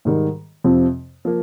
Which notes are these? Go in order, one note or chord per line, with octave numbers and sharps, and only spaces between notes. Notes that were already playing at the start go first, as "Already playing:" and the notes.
G#2 D#3 G3
F2 C3 F3 C4
F3 A#3